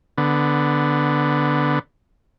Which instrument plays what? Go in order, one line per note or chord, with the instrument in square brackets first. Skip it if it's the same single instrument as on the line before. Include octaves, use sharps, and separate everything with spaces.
[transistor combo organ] D3 B3